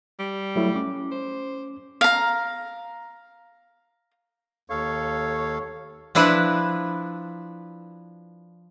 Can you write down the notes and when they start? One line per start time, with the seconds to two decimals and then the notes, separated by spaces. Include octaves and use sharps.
0.19 G3
0.56 F#3 A3 E4
0.76 C#4 D6
1.11 C5
2.01 F5 A#5
4.70 D#2 A4 C#5 F5
6.15 F3 D4 E4 B4